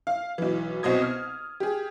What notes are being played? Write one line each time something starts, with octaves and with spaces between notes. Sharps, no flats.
F5
B1 E3
C2 B2 C4 D#5 D#6 G#6
F6
G4 G#4